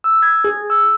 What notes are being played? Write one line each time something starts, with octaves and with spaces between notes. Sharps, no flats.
E6
G#6
G#4
E6